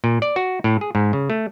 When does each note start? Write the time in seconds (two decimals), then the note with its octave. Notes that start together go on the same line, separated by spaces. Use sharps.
0.04 A#2
0.22 D5
0.36 F#4
0.64 A2
0.81 G#4
0.95 G#2
1.13 C#3
1.30 A3